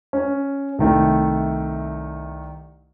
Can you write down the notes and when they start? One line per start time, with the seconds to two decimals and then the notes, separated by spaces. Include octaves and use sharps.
0.13 C#4
0.79 C2 D#3 A3